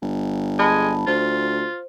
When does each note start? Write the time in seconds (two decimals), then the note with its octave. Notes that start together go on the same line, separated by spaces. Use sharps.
0.02 G1
0.59 G#3 A5 B5
1.07 D2 F4 C5